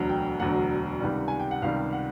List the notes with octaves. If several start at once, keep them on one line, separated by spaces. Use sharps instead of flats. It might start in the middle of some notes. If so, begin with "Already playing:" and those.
Already playing: E1 D2 D3 F#3
G5
E1 D2 D3 F#3 F#5
C#2 C3 D#3 G3
G#5
G5
F#5
C#2 C3 D#3 G3 F5
F#5